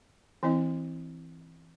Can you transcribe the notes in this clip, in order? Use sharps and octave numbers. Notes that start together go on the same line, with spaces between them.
E3 C4 E4 D#5